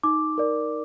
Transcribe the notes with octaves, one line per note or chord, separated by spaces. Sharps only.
D#4 D6
A#4 D5